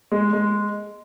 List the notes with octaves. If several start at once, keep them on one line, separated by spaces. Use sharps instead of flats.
G#3
G#3